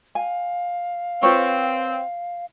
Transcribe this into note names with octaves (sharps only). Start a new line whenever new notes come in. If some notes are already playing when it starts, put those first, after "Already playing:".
F5 G#5
C4 F4 B4 C#5